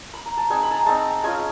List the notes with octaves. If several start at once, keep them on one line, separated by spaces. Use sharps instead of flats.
B5
A#5
A5
G#3 C4 D#4 G#5
B5
A5 A#5
G#3 C4 D#4 A5
G#3 C#4 F4 G#5